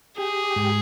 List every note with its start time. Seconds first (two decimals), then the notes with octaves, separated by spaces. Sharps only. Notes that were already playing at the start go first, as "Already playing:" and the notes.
0.18 G4 G#4
0.56 G#2